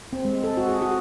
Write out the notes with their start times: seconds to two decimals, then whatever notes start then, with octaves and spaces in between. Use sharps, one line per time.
0.13 C4
0.25 G#3
0.44 A4
0.57 F#4
0.69 G#4
0.82 F#4